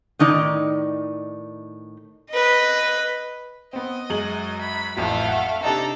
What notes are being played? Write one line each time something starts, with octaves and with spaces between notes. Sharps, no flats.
A2 D#3 D#4 D5
B4 D#5
B3 C4 D#5
F#2 G#3 F#7
B5
A1 F2 F#3 A3 F5
F#5
C3 D4 D#4 A4 A#5